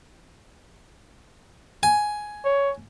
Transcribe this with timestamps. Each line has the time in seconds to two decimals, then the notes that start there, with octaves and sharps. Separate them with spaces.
1.83 G#5
2.45 C#5